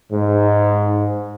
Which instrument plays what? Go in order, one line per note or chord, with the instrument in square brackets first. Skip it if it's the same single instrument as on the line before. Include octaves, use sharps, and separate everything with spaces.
[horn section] G#2